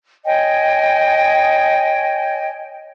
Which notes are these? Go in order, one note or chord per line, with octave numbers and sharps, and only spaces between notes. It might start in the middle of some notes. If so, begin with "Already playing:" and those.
C#5 D#5 G5 G#5